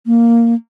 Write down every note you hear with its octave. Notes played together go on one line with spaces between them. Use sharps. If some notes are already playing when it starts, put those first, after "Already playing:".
A#3